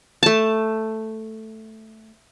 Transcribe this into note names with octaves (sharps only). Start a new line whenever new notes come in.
A3 A5